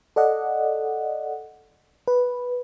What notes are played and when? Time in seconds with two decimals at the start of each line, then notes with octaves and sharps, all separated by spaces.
0.16 A4 D5 D#5 F#5
2.08 B4